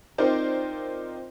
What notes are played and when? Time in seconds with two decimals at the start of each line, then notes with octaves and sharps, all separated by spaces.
0.18 C4 D#4 F4 A#4 C5 D5